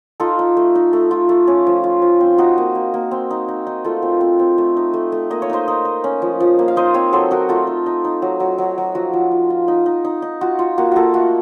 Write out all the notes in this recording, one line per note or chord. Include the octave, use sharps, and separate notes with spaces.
D#4 F4 A4
D#4
A3
D#4
A3
F4
A3
C#4
F3
F4
F3
C4
D#4 F#4
A#3
A#3
A#3
C4
D#4
D#4
D#4
A3 F4 A4
C4
C4
C4
A3
D#4
A3
A3
A#3 D#5
C#5
D#4 C5 D#5
D#4
D#4
C#4
F3
F3
A#3
F5
D#4 C5 D#5
C4 C#5 F5
F#3 A4 C5
D#4 F#4 A#4
A3 F4 A4
D#4
D#4
D#4
F#3
F#3
F#3
F#3
F3 F#4
F3
F4
F4
D#4
D#4
D#4
D#4
F4 F#4
F4
A#3 F#4
A#3 F4 F#4 A4
A3 F#4